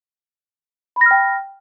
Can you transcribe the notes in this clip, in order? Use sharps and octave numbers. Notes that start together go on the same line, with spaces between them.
G5 B5 F6 A#6